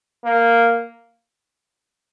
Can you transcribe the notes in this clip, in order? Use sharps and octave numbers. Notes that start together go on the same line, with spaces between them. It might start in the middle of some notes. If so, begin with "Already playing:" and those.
A#3